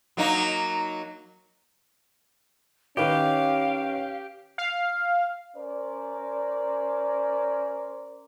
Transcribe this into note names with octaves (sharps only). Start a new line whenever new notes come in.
F#3 A#3 D#4
D#3 C#4 G4 B4 C#5 F5
F5
C#4 A#4 C5 D5